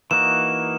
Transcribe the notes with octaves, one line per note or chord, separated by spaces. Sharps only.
E3 A#3 D#4 F#4 E7